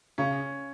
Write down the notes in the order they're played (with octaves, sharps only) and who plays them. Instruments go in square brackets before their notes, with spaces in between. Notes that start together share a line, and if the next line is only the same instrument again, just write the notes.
[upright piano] C#3 [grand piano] C#4